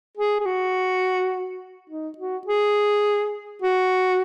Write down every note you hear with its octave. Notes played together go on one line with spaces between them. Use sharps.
G#4
G#4
F#4
D#4
F#4
G#4
F#4